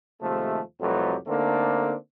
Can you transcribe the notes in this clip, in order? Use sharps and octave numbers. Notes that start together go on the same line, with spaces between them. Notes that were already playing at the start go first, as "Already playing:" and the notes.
D#2 C3 F3 G#3 A3
C2 F2 F#3 A3 G4 B4
D3 A3 A#3 C4 D4 D#4